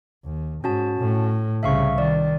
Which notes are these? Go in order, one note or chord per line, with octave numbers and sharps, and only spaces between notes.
D#2
G#2 C#4 F#4 A5
A2
C2 C#3 E5 F5 C#6
D#3 D5